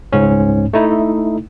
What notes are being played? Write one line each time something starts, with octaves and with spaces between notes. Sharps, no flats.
C#2 G#2 C#4
A3 D#4 E4